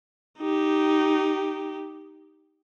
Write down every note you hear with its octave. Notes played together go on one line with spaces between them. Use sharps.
D#4 G4